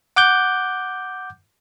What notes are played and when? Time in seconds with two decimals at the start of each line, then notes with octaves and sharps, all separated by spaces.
0.16 F#5 D6 F#6 G6